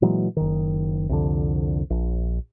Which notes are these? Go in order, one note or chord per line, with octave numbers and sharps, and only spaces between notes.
A#2 E3 F#3 G#3
F#1 D#3
C2 F2 D3
A#1